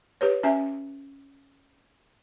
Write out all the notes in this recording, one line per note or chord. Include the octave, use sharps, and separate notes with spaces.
G4 B4 C#5
C#4 E5 G#5